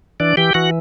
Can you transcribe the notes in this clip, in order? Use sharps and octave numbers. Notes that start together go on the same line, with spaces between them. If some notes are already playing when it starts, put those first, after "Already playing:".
E3 D4 D5
E3 G4 G5
E3 F#4 F#5